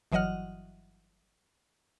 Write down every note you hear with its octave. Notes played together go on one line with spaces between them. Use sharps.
G1 E3 F#3 D#5 F#5 F6